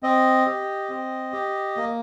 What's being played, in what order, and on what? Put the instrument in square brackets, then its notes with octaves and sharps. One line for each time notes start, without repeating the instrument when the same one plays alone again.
[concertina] C4 D#5
G4
C4
G4
A#3